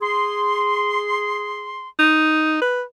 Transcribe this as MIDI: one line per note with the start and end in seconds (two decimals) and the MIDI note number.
0.02 1.88 68
0.02 1.88 84
1.99 2.58 63
2.61 2.82 71